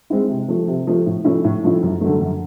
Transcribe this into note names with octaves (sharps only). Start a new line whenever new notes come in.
G#3 C4 E4
C3
F3 A3
C3
F3 A3
A2
F3 A3 C#4 E4
A2
F3 A3 C#4 E4
F#2
D3 F#3 A3
F#2